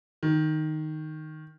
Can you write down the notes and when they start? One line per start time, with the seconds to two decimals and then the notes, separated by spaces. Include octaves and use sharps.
0.23 D#3